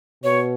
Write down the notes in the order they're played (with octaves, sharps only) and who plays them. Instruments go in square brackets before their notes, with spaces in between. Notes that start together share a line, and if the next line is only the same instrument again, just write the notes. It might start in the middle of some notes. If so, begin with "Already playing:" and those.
[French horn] B2 [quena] C#5